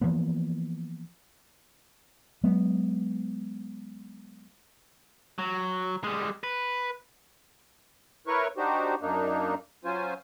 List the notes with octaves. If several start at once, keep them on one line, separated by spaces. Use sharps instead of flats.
E3 F3 A#3 B3
F#3 G#3 B3
F#3
G3 G#3
B4
E4 A#4 B4 C#5 C#6
D4 D#4 F#4 G4 C5
F#2 A#3 D4 D#4
F#3 C#4 F4 C5 G#5